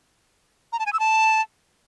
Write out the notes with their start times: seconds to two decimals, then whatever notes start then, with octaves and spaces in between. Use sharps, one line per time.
0.73 A#5
0.79 A5
0.86 G#5
0.93 E6
1.00 A5